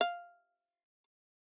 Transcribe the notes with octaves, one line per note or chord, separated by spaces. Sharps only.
F5